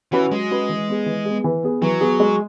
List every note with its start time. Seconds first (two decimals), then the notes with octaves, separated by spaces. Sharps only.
0.12 E3 C#4 F#4 B4
0.31 F#3 G#3
0.50 C#4 F#4 B4
0.69 E3
0.88 B3 G#4
1.06 E3
1.25 B3 G#4
1.44 E3
1.63 B3 G#4
1.82 E3 F#3
2.01 B3 G#4
2.20 G#3